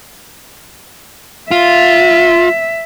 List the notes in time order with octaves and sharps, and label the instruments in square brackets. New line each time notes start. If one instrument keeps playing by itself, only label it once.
[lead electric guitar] F4 [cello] E5